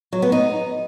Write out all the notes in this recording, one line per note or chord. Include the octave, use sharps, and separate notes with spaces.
F#3
B3
D#4